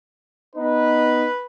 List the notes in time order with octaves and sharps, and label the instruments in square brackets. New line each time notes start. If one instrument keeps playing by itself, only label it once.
[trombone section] B3 D#4 [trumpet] B4